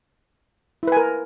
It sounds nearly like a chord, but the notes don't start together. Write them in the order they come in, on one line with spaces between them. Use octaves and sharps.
E4 B4 G#5 A#4